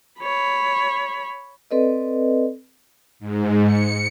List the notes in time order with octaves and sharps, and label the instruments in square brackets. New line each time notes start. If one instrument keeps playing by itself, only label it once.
[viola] C#5 B5
[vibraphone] C4 A4 B4 D5 D#5
[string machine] G#2
C#7